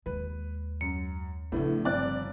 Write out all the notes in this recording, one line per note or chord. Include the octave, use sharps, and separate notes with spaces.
D#2 G#3 B4
F#2 C#7
A2 C#3 F3 A3 B3 D4
G1 C4 D5 F#6